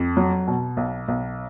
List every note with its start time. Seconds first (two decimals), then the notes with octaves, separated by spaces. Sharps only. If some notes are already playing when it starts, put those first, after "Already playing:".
Already playing: F2
0.17 F#3
0.47 B2
0.77 B1
1.08 B1